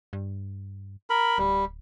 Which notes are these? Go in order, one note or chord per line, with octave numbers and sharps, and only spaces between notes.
G2
A#4 B5
D1 G3